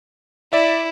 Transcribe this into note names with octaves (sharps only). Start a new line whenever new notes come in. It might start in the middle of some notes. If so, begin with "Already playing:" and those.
E4 D5 E5